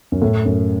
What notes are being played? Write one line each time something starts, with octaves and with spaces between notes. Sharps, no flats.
F#2
A2
F#2